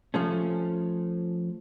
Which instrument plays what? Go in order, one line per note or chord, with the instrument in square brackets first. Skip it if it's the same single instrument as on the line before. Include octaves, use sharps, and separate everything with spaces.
[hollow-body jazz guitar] F3 A3 C#4